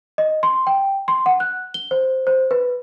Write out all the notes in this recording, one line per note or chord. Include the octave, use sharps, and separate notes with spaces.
D#5
C6
G5
C6
F#5
F#6
G7
C5
C5
B4